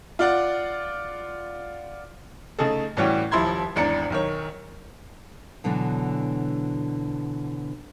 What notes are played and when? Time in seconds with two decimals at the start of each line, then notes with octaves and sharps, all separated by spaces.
0.19 F4 D5 F#5
2.59 C#3 A3 D#4 G#4 A4
2.97 A2 E3 G3 C#4 F#4 G4
3.31 D#1 F3 E4 B5 C6 G#6
3.76 G#1 E2 D4 A#5 C#7
4.10 B1 D#3 C#5
5.64 B2 D3 E3 F#3 D4